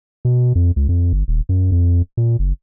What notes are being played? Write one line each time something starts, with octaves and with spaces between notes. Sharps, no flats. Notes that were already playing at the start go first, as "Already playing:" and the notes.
B2
F2
C#2
F2
G1
D#1
F#2
F2
A#2
F#1